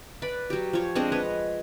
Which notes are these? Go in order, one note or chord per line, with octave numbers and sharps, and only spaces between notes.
B4 D5 B5
F#3 G4
F3 C#5
G#3 C4 D4 D#5
B4 C#5 D#5